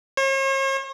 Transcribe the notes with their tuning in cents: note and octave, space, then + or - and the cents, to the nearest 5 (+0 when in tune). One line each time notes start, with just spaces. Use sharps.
C#5 -45